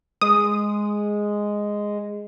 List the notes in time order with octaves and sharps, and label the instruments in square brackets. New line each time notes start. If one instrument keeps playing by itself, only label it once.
[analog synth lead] G#3 [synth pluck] D#6